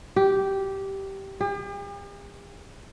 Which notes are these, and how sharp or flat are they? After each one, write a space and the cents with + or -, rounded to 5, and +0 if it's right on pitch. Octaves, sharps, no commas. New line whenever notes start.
G4 -10
G4 +45